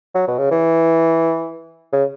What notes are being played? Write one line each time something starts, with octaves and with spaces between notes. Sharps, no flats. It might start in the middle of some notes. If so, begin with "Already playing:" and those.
F#3
B2
C#3
E3
C#3